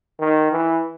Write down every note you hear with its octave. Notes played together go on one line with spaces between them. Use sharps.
D#3
E3